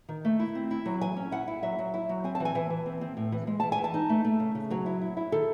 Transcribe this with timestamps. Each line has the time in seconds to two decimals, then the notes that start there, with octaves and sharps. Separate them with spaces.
0.09 D#3
0.25 A3
0.40 E4
0.55 C4
0.71 E4
0.86 F#3
1.01 E3 G#5
1.17 C#4
1.32 E4 F#5
1.48 E4
1.63 F#3 E5
1.79 F#3
1.94 E4
2.09 F#3
2.24 C4 G#5
2.35 A5
2.40 E3
2.45 G#5
2.55 E3
2.70 E3
2.86 C4
3.01 C4
3.17 A2
3.32 E3
3.47 G#3
3.60 E3 A5
3.72 G#5
3.78 E3
3.84 A5
3.94 D#4
4.09 A3
4.25 A3
4.40 C#3
4.55 C#3
4.70 F#3 C#5
4.86 E4
5.02 E4
5.17 E4
5.32 D#3 A4